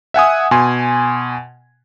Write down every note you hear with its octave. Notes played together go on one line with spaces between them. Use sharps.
E5 F#5 G#5 D#6
B2 G#5 C6